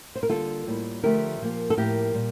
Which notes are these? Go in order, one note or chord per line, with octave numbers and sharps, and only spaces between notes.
C5
A#4
D3 G3 A#3 F4 A4
A2 G3 A#3
D3 F3 A3 G4 A#4
A#2 F3 A#3
A4
A2 F3 A#3 G4 A#4
A#2 G3